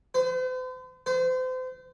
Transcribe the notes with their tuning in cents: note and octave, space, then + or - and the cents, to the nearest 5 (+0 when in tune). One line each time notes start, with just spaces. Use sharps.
C5 -45
C5 -35